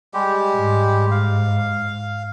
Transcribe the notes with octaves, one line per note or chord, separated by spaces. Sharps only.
G3 G#3 G4
G#2
F5